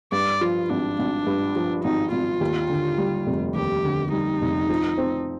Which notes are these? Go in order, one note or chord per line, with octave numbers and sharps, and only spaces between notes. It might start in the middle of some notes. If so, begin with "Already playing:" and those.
G2 D5
F3 F4
G#1 D4
G#1
G2
F3
G#1 D#4
G#1 F4
D#2
D3
G3
F1
D#2 G4
D3
G3 D#4
F1
F3
C4